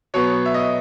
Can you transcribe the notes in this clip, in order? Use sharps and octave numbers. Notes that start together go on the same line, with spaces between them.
B2 F#3 B3 C#5
E5
D#5